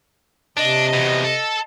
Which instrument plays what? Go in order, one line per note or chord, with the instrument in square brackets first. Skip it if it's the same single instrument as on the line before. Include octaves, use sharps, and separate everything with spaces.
[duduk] C3 [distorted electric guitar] D4 [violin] D#5
[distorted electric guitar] E2 B2
A4